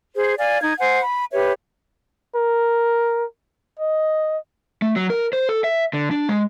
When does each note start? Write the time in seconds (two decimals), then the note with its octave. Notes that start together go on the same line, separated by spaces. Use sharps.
0.16 G#4 C5
0.37 D5 F5 G#5
0.61 D#4 G#6
0.79 C5 F#5 G#5
1.01 B5
1.32 G4 B4 C#5 E5
2.36 A#4
3.79 D#5
4.82 A3
4.96 F#3
5.10 A#4
5.33 C5
5.49 A4
5.64 E5
5.93 D3
6.11 D4
6.29 G#3